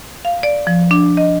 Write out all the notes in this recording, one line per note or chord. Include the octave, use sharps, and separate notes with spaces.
F5
D5
F3
D4
D#5